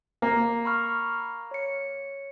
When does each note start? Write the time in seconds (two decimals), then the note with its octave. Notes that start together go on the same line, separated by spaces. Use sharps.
0.22 A#3
0.65 B5 C#6 F6
1.51 C#5 C#7